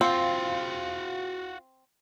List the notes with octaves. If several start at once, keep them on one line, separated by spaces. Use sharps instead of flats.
C4 F4 F#4 F5